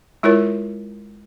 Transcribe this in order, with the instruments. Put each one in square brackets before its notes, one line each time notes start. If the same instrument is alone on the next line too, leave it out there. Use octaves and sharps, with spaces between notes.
[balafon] G#3 E4 F4 A#4 C#5